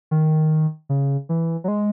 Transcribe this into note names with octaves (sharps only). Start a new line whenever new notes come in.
D#3
C#3
E3
F#3
G#3